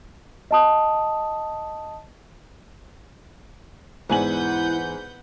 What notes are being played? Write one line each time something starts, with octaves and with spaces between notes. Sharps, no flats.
D#5 A5 D#6
E2 G#2 E4 B4 F#5 G#5 G6 F#7